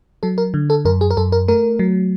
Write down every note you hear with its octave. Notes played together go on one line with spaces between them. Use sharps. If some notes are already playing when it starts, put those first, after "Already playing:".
F#3 A4
A#4
D3
A4
F#2 A#4
G#4
A#4
F#2 A4
A#4
A3 A#4
F#3